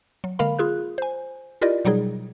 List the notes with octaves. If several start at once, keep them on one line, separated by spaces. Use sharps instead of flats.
F#3
D3 G#3 A#3 A#4 F5 B5
F4 G#4 F#6
C5 G#5
E4 F4 G4 A#4 D5 D#5
B2 F#3 G3 D#4 G#4